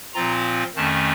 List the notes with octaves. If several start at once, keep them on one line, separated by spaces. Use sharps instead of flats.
A#2 F3 C4 F4 A#5
F2 D#3 A3 C#4 A5